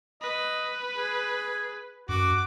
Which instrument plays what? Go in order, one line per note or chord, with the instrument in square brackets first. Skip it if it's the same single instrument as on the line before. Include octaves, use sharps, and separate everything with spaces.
[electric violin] B4 [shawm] D#5
[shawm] G#4
[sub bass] F#2 [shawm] F#4 [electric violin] D6